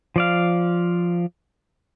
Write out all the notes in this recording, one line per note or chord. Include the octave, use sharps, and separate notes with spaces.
F3 D5 F5